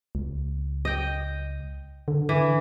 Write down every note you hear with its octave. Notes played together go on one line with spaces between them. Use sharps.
C#2
D#5 G5
D3
D3 E3